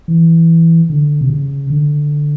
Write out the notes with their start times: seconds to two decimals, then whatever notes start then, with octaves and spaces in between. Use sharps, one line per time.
0.08 E3
0.90 D3
1.21 C3
1.30 C#3
1.70 D3